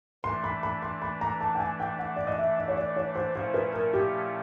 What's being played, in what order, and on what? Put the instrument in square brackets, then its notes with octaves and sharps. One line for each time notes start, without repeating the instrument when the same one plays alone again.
[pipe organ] E3 A3 D4 [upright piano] C6
[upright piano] B5
B5
C6
B5
A#5
A5
G5
G#5
G5
F#5
D5
D#5
E5
D#5
C#5
D5
C#5
C5
[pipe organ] A#2 F3 A3 C#4 E4 [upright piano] C5
[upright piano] B4
A#4
G4